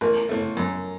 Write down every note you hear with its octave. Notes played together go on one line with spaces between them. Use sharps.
A1 A#4
A2 A3
F#2